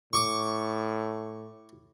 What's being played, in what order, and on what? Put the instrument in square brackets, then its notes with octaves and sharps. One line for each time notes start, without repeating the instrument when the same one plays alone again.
[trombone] A2 [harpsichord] C#6 D6